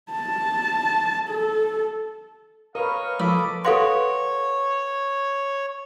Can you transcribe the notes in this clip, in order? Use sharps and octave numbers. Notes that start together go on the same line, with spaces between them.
A5
A4
A#4 B4 C#5 D#5 F5 C#6
F3 A4 B5 D6
A4 B4 C#5 F5 F#5 C6 A#6